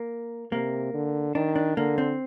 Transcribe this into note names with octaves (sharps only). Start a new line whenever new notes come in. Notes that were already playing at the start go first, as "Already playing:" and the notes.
Already playing: A#3
C3 A#3
D3
D#3 D4
D4
D3 A#3
C4